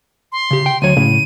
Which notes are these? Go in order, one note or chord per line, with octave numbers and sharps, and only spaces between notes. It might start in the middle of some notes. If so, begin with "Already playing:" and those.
C6
C#3 G4
G5
D2 F#3 C#5 D#7
A2 C#3